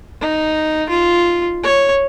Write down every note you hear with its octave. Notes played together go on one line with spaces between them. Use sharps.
D#4
F4
C#5